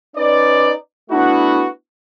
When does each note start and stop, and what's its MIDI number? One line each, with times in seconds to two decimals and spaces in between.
0.16 0.73 61
0.16 0.73 63
0.16 0.73 71
0.16 0.73 74
1.10 1.67 57
1.10 1.67 59
1.10 1.67 62
1.10 1.67 64
1.10 1.67 66